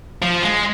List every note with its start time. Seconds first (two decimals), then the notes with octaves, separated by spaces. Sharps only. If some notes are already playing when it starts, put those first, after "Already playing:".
0.23 F3
0.42 G#3